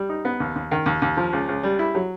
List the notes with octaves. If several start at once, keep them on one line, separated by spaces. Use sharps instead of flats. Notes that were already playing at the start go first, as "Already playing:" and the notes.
Already playing: G3
D#4
B3
D#2
D#2
D#3
D#2
D#2
F3
C#2
C#2
G3
E4
F#3